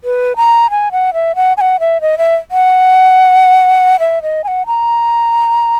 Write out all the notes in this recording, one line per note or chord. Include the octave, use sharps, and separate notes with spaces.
B4
A#5
G#5
F#5
E5
F#5
G#5
F#5
E5
D#5
E5
F#5
E5
D#5
G#5
F#5
A#5